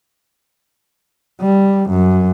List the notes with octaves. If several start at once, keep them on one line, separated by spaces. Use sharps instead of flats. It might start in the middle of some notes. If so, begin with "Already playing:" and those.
G3
F#2